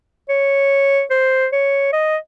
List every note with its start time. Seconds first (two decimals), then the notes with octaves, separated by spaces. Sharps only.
0.29 C#5
1.11 C5
1.52 C#5
1.93 D#5